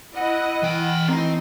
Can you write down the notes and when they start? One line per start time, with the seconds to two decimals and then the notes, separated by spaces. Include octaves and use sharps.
0.15 E4 D#5 F#5
0.63 E3 G5
1.08 E3 A3 C4 D#4